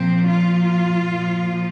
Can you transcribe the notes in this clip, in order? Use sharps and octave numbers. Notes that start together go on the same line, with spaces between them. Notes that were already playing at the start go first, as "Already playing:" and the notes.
Already playing: A#2 F3 C4
F4
A#2 F3